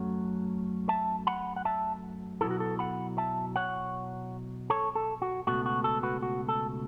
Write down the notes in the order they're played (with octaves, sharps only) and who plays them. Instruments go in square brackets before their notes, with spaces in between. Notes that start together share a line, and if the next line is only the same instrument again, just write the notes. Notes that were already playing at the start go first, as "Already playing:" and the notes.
Already playing: [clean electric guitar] F#2 F#3 A3 C#4 F#5
E5 A5
F#5 B5
F#5
E5 A5
B2 F#3 B3 E4 A4
F#4
A4
F#5 B5
E5 A5
C#5 F#5
A4 C#5
A4
F#4
C#2 B2 A3 F#4
F#4
A4
F#4 B4
F#4
A4